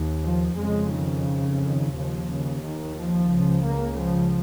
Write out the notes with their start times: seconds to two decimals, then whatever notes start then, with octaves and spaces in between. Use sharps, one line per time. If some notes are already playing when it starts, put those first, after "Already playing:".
Already playing: D#2
0.23 F3
0.57 F2 C#3 G#3
0.91 D#3
1.60 D#3
1.94 D#2 C#3 F3
2.28 C#3
2.63 D#3
2.97 F3
3.31 C#2 C#3
3.66 A#3
3.99 F3